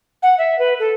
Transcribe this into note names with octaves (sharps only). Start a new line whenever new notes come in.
F#5
E5
B4
A4